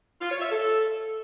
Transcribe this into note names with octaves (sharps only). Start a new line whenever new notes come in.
F4
C#5
E5
A4